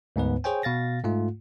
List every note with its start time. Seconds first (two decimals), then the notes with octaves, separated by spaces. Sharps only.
0.16 D2 G#2 B3 B4
0.44 G#4 C5 C#5 G5 G#5
0.63 B2 F5 A6 A#6
1.03 G#2 A3 F4